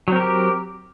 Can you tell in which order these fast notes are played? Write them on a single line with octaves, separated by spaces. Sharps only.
F#3 C4 A#4 G4